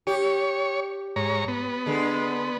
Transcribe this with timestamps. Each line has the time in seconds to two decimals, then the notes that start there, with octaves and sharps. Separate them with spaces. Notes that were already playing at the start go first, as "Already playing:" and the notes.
0.07 G4 C#5
1.16 G#2 C#5 A#5
1.48 B3
1.86 D3 G#3